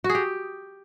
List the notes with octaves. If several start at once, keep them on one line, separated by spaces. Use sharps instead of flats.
F#4
G#4
G4